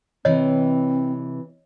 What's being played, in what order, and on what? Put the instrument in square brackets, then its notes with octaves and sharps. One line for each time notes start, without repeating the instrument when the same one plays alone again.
[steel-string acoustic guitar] C3 E3 [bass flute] C4 [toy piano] C#5 D#5